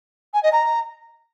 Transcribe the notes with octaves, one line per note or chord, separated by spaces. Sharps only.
G#5
D#5
A#5